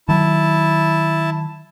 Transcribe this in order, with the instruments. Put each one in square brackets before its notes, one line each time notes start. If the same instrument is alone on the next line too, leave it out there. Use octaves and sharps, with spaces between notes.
[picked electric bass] D#3 F#3 [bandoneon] E4 A5